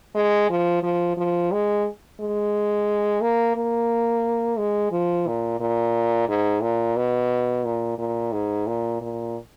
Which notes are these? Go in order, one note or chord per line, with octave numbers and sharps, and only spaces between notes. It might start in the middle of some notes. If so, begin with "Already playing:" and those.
G#3
F3
F3
F3
G#3
G#3
A#3
A#3
G#3
F3
A#2
A#2
G#2
A#2
B2
A#2
A#2
G#2
A#2
A#2